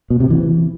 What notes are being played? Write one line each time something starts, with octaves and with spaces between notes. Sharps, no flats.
B2
C3
E3